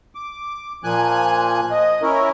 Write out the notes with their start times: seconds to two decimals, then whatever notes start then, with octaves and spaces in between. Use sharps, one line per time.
0.15 D6
0.84 A#2 F3 G#5 F#6
1.71 D#5
2.02 C#4 E4 A#4